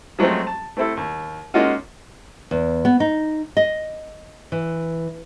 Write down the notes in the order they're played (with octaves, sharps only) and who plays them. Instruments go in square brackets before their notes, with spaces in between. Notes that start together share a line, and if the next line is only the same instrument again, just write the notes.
[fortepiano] F3 F#3 G#3 A3 C4
A5
A3 C4 E4 A4
D#2
G#3 A#3 C#4 D#4 F4 F#4
[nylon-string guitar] E2
B3
D#4
D#5
E3